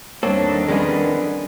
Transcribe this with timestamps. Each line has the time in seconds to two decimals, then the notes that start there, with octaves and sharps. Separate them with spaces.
0.23 E2 D#3 G3 A#3 C4 D4 A4 C#5
0.68 F2 G#3 B3 C#4 A#4 D5